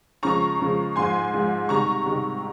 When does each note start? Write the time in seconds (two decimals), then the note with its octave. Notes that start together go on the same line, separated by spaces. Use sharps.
0.23 C#3 F3 G#3 A#5 C#6
0.60 C#3 F3 G#3
0.96 G#2 F3 G#3 G#5 C6
1.33 G#2 F3 G#3
1.69 C3 D#3 G3 A#5 C#6
2.06 C3 D#3 G3